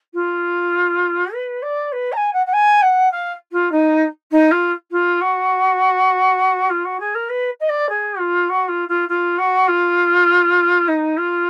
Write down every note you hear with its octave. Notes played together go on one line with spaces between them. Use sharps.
F4
B4
D5
B4
A#5
G#5
F#5
F#5
G#5
F#5
F5
F4
D#4
D#4
F4
F4
F#4
F4
F#4
G#4
A#4
B4
D#5
D5
G#4
F4
F#4
F4
F4
F4
F#4
F4
D#4
F4